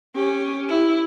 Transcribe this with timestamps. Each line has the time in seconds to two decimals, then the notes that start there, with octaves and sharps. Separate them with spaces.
0.15 C#4 G4
0.68 E4 G4